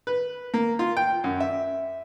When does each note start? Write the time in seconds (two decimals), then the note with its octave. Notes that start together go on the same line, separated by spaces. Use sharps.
0.07 B4
0.54 A#3
0.79 F4
0.97 G5
1.24 F#2
1.40 E5